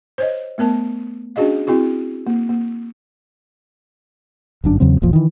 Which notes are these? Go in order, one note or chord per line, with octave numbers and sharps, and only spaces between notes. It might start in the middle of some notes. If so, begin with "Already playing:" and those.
C5 C#5 D#5
A3 B3 A#4 A5
C#4 D4 F#4 G#4 D#5 F5
C4 E4 F#4 G#4
A#3
A#3
G1 F#2 D4
E2 C#3 F#3 C4
E1 A1 A#2 F3
D#3 E3